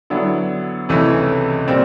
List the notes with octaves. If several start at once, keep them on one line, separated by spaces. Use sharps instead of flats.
D3 F#3 B3 E4
C#2 C3 E3 A3 C#4
A#2 G3 C4